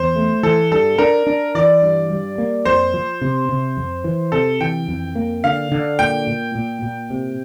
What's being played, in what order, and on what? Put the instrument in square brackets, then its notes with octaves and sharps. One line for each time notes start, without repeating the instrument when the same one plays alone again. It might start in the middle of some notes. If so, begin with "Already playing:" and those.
Already playing: [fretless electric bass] E2 [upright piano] C5
[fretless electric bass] A3
[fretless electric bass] E3 [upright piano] A4
[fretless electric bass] G2 [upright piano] A4
[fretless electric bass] D4 [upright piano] A#4
[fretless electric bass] D4
[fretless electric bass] E3 [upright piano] D5
[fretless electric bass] G2
G3
A#3
[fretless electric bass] F2 [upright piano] C5
[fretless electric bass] F3
C3
C3
F2
E3
[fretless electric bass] C3 [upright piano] A4
[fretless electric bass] E3 [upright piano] G5
[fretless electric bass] F2
A#3
[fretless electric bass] D3 [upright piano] F5
[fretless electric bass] D3
[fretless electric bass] A#2 [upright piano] G5
[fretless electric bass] A#2
A#2
A#2
C3